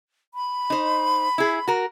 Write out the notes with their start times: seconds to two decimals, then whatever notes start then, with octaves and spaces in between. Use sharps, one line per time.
0.34 B5
0.70 D#4 C5
1.38 E4 G#4
1.68 F#4 A#4